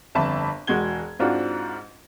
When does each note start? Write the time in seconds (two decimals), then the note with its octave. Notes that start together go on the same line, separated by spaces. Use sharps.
0.15 G1 F2 E5 A5 B5
0.67 E1 G#3 F#4 G#6 G7
1.19 G#2 C4 D4 F4 F#4